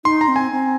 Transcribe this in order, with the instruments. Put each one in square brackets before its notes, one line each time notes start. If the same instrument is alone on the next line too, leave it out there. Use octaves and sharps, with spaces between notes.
[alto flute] D#4 [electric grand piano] C6
[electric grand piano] A#5
[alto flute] C4
[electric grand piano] G#5
[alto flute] C4